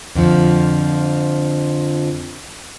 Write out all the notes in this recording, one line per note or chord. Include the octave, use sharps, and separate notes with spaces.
F2 D3 F3